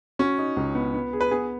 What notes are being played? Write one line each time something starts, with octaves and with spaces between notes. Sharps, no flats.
C#4 F#4
D#4
C#2
B3
B3
G#4
B4
B3 G#4